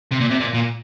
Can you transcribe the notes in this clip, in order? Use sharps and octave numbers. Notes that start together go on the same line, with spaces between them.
C3
A#2
C3
A#2
A#2